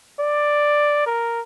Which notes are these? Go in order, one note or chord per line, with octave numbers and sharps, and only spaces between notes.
D5
A#4